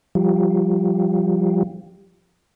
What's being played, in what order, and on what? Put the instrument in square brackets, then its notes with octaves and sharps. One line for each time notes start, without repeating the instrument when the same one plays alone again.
[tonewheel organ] F3 G3